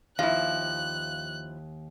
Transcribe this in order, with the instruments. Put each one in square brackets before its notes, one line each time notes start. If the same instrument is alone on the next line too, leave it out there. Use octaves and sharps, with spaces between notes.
[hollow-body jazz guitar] D#2 [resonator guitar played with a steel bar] F3 E4 [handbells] F5 [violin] F#6